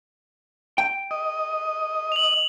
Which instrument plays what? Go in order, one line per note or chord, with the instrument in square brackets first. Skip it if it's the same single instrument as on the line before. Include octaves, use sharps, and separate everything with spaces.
[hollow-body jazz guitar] G5
[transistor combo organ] D#5
[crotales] F7 F#7